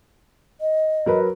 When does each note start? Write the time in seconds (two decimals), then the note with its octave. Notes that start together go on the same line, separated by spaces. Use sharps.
0.61 D#5
1.06 F#3 A#4 B4